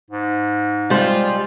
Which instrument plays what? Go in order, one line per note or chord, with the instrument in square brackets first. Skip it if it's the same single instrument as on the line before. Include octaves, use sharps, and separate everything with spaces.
[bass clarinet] G#2
[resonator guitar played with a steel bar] G3 C5 [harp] G#3 [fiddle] F4